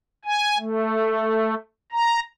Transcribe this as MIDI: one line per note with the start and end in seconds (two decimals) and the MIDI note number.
0.25 0.58 80
0.58 1.55 57
1.92 2.20 82